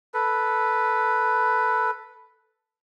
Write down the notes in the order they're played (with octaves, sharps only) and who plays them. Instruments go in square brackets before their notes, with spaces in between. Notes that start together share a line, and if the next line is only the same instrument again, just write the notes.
[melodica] A4 B4